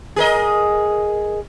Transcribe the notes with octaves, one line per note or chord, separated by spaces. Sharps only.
G#4 A#4 D#5